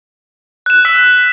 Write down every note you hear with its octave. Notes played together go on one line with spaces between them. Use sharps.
F#6 E7
E6 B6